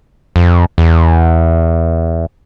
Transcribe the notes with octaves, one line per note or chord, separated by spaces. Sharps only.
F2
E2